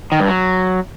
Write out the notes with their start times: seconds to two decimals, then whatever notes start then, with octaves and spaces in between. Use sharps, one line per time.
0.12 D#3
0.20 G2
0.28 F#3